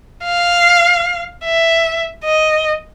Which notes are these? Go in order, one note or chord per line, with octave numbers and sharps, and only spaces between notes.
F5
E5
D#5